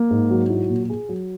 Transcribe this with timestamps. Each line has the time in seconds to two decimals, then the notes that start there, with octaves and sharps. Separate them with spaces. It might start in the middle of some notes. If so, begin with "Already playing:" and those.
Already playing: A#3
0.11 G#2
0.31 F#3
0.50 E4
0.69 A#2
0.90 G#4
1.09 F#3